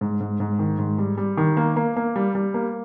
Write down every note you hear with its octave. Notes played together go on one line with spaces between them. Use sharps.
G#2
G#2
G#2
D#3
G#2
G3
G3
D#3
A#3
A#3
A#3
G3
G3
A#3